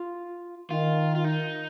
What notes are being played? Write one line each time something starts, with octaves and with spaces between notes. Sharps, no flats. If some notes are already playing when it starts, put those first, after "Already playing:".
Already playing: F4
D#3 F4
F4
D#4